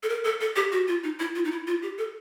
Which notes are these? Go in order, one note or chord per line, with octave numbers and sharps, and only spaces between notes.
A4
A#4
A4
A4
G4
F#4
F4
D#4
E4
F4
D#4
E4
F4
G4
A4